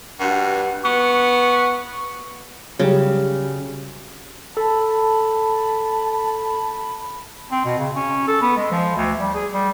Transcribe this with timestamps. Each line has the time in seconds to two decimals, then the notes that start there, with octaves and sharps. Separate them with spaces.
0.20 G2 F#4
0.85 B3 C#6
2.79 C#3 F#3 G3
4.57 A4 A5 B5
7.51 C4
7.65 B2
7.78 C#3
7.95 C#4
8.28 A4
8.41 B3
8.57 G#3
8.71 F3
8.96 D2
9.19 G3
9.34 G#4
9.53 G3